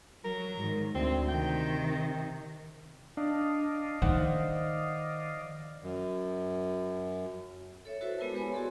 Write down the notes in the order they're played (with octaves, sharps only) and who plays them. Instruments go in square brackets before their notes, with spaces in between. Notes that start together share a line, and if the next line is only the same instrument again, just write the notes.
[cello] F#3 [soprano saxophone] A#4
[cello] G#2 D#3
[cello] D2 [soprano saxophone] C4
[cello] C3 D#3 [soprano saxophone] G5
[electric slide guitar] D4 [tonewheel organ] D5 D#5 F5
[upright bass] D#3 [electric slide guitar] C5 F#5
[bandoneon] F#2
[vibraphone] A4 C#5 E5
E4 F#4 A4 B4 C5 E5
G#3 B3 E4 A#4 B4 A5
B3 G4 B4 C#5 G#5 B5
F#4 G#4 A4 D5 C6